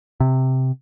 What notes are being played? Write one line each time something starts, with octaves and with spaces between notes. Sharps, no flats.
C3